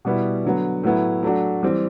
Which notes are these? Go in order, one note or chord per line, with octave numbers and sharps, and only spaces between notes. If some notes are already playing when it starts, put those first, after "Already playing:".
B2 G3 B3 E4
D3 F#3 B3
A2 F#3 B3 E4
F#3 A3 D4 F#4
E3 G3 C4